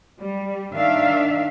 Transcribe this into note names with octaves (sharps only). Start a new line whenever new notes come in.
G3
D#3 D4 E5 F5